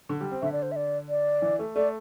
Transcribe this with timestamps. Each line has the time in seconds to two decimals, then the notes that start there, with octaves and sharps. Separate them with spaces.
0.09 D3
0.21 G3
0.31 C4
0.42 D3 E5
0.52 D5
0.62 C5
0.72 E5
0.76 D5
1.09 D5
1.42 E3
1.59 A3
1.76 A3 D5